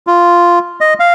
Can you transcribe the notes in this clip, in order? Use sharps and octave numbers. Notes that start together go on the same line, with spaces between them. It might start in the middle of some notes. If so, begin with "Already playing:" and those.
F4
D#5
F5